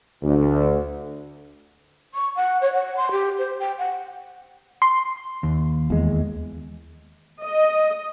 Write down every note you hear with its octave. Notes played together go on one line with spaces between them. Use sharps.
D2
C#6
F#5
C#5
F#5
C6
G4
C5
G5
F#5
C6
D#2
E2 G#3
D#5